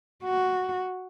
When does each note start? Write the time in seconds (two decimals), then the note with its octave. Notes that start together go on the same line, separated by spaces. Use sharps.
0.24 F#4